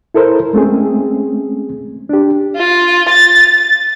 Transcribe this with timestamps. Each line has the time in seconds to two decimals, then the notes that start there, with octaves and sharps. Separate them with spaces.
0.14 E4 A4 A#4 C5
0.53 G#3 A3 C4 C#4 G#4
2.09 D4 G4
2.55 F4
3.09 A6